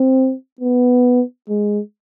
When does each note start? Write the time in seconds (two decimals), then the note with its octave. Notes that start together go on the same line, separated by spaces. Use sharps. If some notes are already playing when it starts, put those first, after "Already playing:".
Already playing: C4
0.60 B3
1.49 G#3